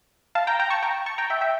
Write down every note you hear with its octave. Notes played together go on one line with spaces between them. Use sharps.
F5 A5
G5 A#5
G5 A#5
A5 C#6
G5 A#5
A5 C#6
G5 A#5
E5 G5
E5 G5